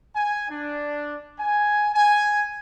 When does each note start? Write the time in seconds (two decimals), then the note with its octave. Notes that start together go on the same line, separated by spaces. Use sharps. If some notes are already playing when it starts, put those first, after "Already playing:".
0.15 G#5
0.50 D4
1.39 G#5
1.94 G#5